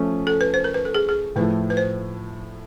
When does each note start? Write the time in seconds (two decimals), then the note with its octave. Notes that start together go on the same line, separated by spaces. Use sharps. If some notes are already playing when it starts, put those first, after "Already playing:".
Already playing: F3 A3 C#4
0.27 A4
0.41 B4
0.54 C5
0.64 A#4
0.74 B4
0.85 A4
0.95 G#4
1.09 G#4
1.36 A2 F3 A3 B4
1.70 B4
1.77 C5